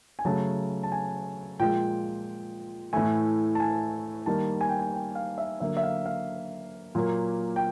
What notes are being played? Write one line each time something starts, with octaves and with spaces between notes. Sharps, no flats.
G#5
C#3 F#3 A3 A5
A5
G#5
A#2 F3 G#3 G5
A2 E3 A3 G#5
A5
G#5
D#3 G3 A#3 A5
G#5
G5
G#5
G5
F5
E5
D3 F#3 A#3 E5
E5
F5
F5
A#2 F#3 A#3
G5